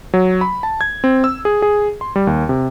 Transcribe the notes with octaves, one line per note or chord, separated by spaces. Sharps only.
F#3
B5
A5
G#6
C4
E6
G#4
G#4
C6
G3
D#2
C3